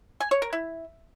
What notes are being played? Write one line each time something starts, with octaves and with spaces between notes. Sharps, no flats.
G#5
C#5
A#4
E4